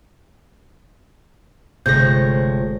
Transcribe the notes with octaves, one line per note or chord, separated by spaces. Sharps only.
G1 C3 F3 G#3 A3 C#5 G6 A#6